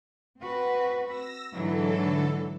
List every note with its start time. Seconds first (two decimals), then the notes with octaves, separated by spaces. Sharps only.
0.42 C4 F#4 B4
1.04 E6 A#6
1.53 G#2 D3 E3 F#3 A4